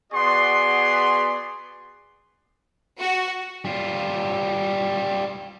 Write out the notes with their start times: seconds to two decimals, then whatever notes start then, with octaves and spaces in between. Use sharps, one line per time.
0.13 B3 F#4 G#4 D5 C6
2.99 F#4
3.65 G3 F4